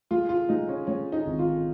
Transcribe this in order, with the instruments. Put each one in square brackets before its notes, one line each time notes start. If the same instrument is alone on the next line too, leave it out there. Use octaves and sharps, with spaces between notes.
[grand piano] G#3 [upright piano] F4
[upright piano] F4
[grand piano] G#3 [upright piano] D#4
[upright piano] C#4
[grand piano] G#3 [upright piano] C#4
[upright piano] D#4
[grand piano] G#1
[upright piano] F4